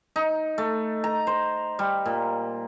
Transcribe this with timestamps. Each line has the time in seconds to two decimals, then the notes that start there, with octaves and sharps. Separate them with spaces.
0.16 D#4
0.58 A3
1.04 A#5
1.27 C5
1.79 G3
2.06 A#2